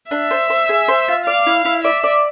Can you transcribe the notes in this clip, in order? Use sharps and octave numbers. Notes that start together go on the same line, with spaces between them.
D4 E5
C5
C5
G#4
C5
F4
D5 F5
E4
E4
D5 E5
D5